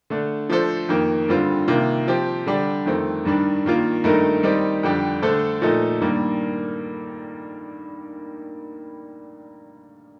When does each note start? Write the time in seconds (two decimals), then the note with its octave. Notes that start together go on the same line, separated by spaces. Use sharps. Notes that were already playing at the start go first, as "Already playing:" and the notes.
0.10 D3 A3 D4
0.50 F3 A3 D4 A4 C5
0.89 F2 D#3 A#3
1.28 G2 D3 G3 C4 F4
1.67 C3 D#3 A#3 F4
2.08 F3 C4 G4
2.47 D3 G3 D4 G4
2.86 F2 D#3 A3 C4
3.25 G2 D#3 G3 D4
3.65 G2 D#3 A#3 F4
4.04 G2 D#3 A3 D#4 A#4
4.43 D#3 G3 C4 D#4 G4
4.83 F2 D3 G3 D4 G4
5.22 D3 A3 D4 A4 C5
5.62 A#2 F3 A3 D#4 A4
6.01 G2 D#3 G3 A#3